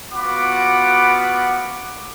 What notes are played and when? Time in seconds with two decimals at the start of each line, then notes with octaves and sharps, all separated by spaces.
0.12 B3 F4 F#4 F#5 B5 D6